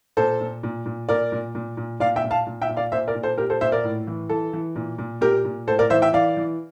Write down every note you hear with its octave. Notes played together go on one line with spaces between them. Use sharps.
A#2 A4 C5
A#2
A#2
A#2
A#2 A#4 D5
A#2
A#2
A#2
A#2 D5 F5
E5 G5
A#2
F5 A5
A#2
E5 G5
A#2
D5 F5
A#2 C5 E5
A#4 D5
A#2
A4 C5
A#2 G4 A#4
A4 C5
A#2 C5 E5
A#4 D5
A2
E3
E3 A4
E3
A#2
A#2
A#2 G4 A#4
A#2
A2 A4 C5
A#4 D5
E3 C5 E5
E5 G5
E3 D5 F5
E3